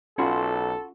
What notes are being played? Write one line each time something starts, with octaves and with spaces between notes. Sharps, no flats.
B1 C#4 F4 F#4 A4 B5 C6